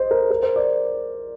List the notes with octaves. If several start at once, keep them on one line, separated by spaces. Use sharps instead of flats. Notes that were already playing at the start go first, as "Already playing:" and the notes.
Already playing: C5 D#5
A#4
A#4
C5
D5